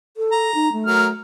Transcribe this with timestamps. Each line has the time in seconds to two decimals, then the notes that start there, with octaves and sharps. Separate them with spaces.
0.17 A4
0.32 A#5
0.55 D#4
0.73 A3
0.86 F#3 A#4 F6